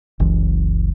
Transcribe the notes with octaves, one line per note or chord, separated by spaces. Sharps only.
F#1 C#2 E3